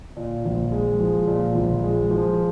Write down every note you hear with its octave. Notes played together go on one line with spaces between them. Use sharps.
A#2
A#1
G#3
F3
A#2
A#1
G#3
F3